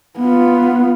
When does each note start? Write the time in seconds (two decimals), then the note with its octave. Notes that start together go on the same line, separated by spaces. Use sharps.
0.19 B3 F4